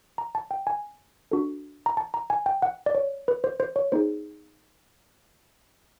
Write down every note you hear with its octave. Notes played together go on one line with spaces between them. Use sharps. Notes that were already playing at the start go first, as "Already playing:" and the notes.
A#5
A5
G5
G#5
D4 F#4 A4
A#5
A5
A#5
G#5
G5
F#5
D5
C#5
B4
C5
C5
C#5
B3 D#4 G#4 C5